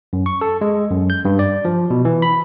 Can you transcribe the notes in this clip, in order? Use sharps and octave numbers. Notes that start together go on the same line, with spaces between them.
F#2
C#6
A4
G#3
F#2
G6
G2
D5
F3
B2
E3
B5